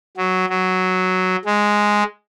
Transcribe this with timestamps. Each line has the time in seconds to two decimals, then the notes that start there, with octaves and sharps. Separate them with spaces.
0.17 F#3
0.49 F#3
1.45 G#3